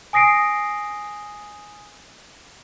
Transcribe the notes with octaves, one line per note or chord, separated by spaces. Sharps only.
G#5 D#6 A#6 C7 D7